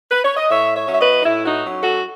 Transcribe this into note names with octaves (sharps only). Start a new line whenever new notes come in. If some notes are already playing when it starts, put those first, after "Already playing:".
B4
C#5
D#5
A2 C#5 E5
C#5 E5
F#3 C#4 E5
B4 D#5
D#4
A2 E4
D#4 F#4
F#3 C#4
F#4 A4